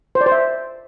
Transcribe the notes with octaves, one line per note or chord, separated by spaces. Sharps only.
C5
D5
C5
E5